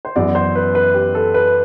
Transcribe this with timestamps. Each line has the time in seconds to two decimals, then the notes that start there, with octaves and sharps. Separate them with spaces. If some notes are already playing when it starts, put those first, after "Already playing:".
0.05 C5
0.16 F#2 E3 B3 F#4 D5
0.35 C5
0.55 B4
0.75 B4
0.94 G4
1.15 A4
1.34 B4